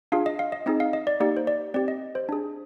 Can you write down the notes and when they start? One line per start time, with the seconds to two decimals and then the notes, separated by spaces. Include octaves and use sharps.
0.12 D4 F4 G#4 F5
0.26 D#5
0.39 F5
0.52 D#5
0.66 C4 D#4 G#4 D#5
0.80 F5
0.93 D#5
1.07 D5
1.20 A#3 D#4 G4 D5
1.37 C5
1.47 D5
1.74 C4 G4 D5
1.88 D#5
2.15 C5
2.29 D4 G#4